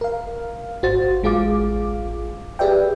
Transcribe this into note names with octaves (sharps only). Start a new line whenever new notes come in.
A#4 F5
G#1 F#4 C5 A6
A1 G#3 F4 G#4 F5 D6
G4 G#4 B4 D5 E5 G5